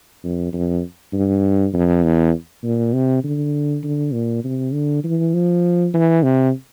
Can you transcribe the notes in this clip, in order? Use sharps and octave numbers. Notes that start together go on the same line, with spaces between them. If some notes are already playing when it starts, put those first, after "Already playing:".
F2
F2
G2
F2
E2
A#2
C3
D3
D3
A#2
C3
D3
E3
F3
E3
C3